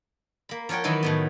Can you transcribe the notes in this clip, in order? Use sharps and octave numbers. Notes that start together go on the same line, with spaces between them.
A#3 B5
F3 A#4 C#5 F#5 G5
D#3 E3 F#3 E4 B4
A2 D#3 B3